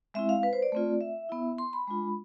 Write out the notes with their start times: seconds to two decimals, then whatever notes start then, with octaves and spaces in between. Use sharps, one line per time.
0.14 G#3 C4 E4 E5
0.29 F5
0.43 B4
0.53 C5
0.62 D5
0.72 A3 C4 F4
1.01 E5
1.29 B3 E4
1.58 C6
1.73 B5
1.87 G#3 D4 F4